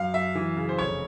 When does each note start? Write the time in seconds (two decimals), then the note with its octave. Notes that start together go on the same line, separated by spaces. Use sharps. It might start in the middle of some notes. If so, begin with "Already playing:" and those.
Already playing: F#2 F5
0.14 F#2 E5
0.35 E3
0.57 C#3
0.69 C5
0.78 F1 C#5